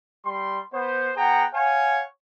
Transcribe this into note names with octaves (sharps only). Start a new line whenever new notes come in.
G3 C6
B3 C5
B3 G#4 F#5 G5 A#5
C#5 F5 F#5 G#5